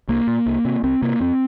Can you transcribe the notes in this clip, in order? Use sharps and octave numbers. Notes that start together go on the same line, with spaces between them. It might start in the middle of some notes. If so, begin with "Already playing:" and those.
C2 A#3
A#2
C2
C3
C2 C4
C3 A#3
F2 C4